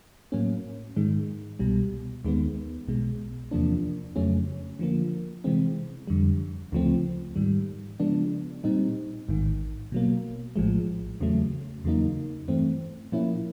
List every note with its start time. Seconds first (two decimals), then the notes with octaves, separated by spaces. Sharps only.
0.32 A2 F#3 A#3 C#4
0.96 G#2 D#3 G#3
1.59 C2 B2 G3
2.25 D#2 D#3 G#3 B3
2.88 B1 B2 G#3
3.51 E2 C3 F3 A#3 D4
4.16 F2 C#3 F#3 A3 C#4
4.79 D3 F3 A#3
5.44 C3 E3 G#3 C4
6.07 F2 D3 G3
6.72 D2 C#3 F3 A3 C4
7.36 G#2 D#3 G3
8.00 C#3 F3 G#3 B3 D4
8.64 A#2 G3 C4 D#4
9.29 A1 G#2 D#3
9.92 B2 F#3 A#3
10.56 A#1 A2 F3 G#3
11.21 E2 C#3 F#3 A3
11.84 E2 C#3 F#3 A#3 D#4
12.48 G2 E3 A3 C4
13.12 A#2 F3 A#3 C#4 E4